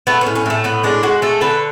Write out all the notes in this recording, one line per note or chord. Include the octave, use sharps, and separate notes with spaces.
A3 B3
C#4
A2
C#4
A2 A3
A2 B3
G#3 D4
G#3 F#4
A3 A4
D3 B4